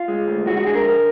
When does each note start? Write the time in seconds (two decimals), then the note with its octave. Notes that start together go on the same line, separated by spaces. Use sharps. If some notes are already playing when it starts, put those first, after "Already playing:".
Already playing: F4
0.08 G#3
0.27 D2
0.47 G#3 F#4
0.57 F#4
0.66 D3 G#4
0.75 A#4
0.84 F2